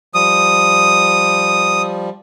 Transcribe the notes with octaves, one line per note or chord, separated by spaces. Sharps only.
F3 G3 D#6